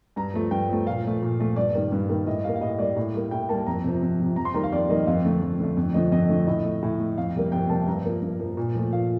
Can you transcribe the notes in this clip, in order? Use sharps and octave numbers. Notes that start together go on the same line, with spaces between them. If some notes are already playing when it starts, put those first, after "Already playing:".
G2 A#5
F3 A3
G2 G5
F3 A3
A#2 F5
F3 A3
A#2
F3 A3
G2 D5
D#3 G3 A#3
G2
D#3 G3 A#3
A2 D#5
G3 A#3 F5
F5
A2 D#5
G3 A#3 D5
A2
G3 A#3
A2 G5
G3 A#3 A5
F2 A#5
C3 F3
F2
C3 F3
F2 A#5
C6
D#3 G3 A#3 A#5
F5
F2 D5
D#3 G3 A#3 D#5
D#5
F2 F5
D3 A3
F2
D3 A3
F2
D3 F3 A3 D#5
F2 D#5
D3 F3 A3
A2 D#5
A3
A2
A3
F2 F5
C3 G3 A#3
F2 G5
C3 G3 A#3 A5
G2 A#5
F3 A#3
G2
F3 A#3
A#2
F3 A3
A#2 F5